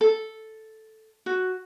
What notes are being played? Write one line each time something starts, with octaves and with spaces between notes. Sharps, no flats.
A4
F#4